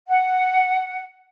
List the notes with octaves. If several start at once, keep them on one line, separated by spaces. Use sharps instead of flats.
F#5